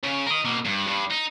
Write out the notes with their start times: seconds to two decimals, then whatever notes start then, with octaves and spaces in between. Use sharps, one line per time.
0.04 C#3
0.27 A#4 D#5
0.45 B2 A#3
0.65 G2
0.87 G2
1.11 D#4